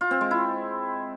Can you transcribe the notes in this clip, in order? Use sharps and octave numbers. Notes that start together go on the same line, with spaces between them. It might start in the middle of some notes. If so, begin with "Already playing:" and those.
F4
C4
G#3
E4